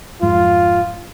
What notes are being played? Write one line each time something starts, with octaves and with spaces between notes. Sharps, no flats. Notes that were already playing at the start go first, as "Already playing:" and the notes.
F2 G#2 F4